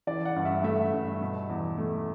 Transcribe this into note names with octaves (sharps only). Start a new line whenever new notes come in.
E3 D5
F#5
G2
E5
A3 E5
G2
B2
E2
A3